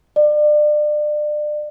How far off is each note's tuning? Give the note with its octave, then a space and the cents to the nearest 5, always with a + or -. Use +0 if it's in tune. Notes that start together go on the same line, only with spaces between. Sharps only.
D5 +30